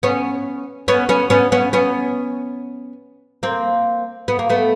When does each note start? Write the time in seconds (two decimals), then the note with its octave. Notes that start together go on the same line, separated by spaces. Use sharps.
0.03 B3 C#4
0.88 B3 C#4
1.09 B3 C#4
1.30 B3 C#4
1.52 B3 C#4
1.73 B3 C#4
3.43 A#3 C4
4.28 B3
4.39 A#3
4.50 A3 B3